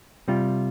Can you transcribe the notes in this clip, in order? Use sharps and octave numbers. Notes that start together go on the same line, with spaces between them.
C3 G3 F4